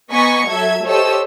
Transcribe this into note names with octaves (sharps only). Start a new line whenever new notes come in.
B3 D#5 G#5 A#5 C#6 B6
F#3 A4 E5 G#6
G4 A4 C5 C#5 D#5 E6